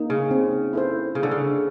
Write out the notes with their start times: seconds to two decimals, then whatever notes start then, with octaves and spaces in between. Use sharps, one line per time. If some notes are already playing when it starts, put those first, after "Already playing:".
Already playing: A#3 D#4
0.10 C#3
0.31 C4
0.73 E4 A4 C5
1.15 C#3 A#3
1.23 D3
1.31 C#3